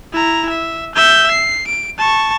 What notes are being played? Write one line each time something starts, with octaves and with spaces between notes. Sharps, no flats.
E4 A#5
E5
E5 G6
C7
D7
A5 C#6